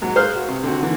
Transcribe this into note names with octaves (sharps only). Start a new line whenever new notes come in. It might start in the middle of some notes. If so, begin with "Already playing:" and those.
G#2 F#3
G#4 B4 C5 F5 F6 F#6
F#4
C3
D3 C4 F#4
D3 E3 A#3